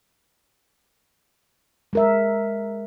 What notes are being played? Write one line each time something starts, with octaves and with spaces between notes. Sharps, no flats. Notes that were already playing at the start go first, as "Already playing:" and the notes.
G#3 A#4 E5